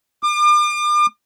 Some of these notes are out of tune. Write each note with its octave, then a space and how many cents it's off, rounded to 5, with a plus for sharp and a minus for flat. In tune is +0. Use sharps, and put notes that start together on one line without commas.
D6 +40